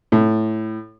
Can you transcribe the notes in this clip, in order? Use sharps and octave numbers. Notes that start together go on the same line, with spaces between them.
A2